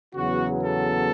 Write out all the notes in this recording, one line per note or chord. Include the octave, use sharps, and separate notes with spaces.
E2 C#3 F#3 B3 F#4
A4